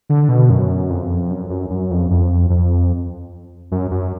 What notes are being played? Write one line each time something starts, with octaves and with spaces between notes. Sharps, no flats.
D3
B2
F#2
F2
F#2
F#2
F#2
F2
F2
F2
F#2
F#2